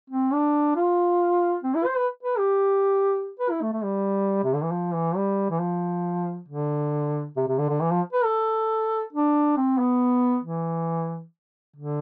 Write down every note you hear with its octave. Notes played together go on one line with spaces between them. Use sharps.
C4
D4
F4
C4
E4
C5
B4
B4
G4
B4
E4
A3
A3
G3
C3
D3
E3
F3
E3
G3
E3
F3
D3
C3
C3
D3
D3
E3
F3
B4
A4
D4
C4
B3
E3
D3